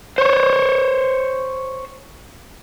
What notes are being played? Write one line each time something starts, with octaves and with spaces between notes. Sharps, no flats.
C5 C#5